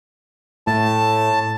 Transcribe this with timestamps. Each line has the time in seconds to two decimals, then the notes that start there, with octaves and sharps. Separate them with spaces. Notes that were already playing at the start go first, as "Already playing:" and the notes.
0.67 A2 A5